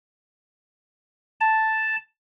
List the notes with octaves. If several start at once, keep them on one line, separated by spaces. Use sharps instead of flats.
A5